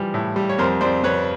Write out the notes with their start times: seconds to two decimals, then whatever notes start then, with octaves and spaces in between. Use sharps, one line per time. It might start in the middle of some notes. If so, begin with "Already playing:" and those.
Already playing: E3 F3 G3
0.14 A2
0.36 G3
0.49 C#5
0.58 F2 A#4 C5
0.81 F2 C5 D5
1.03 F2 B4 C#5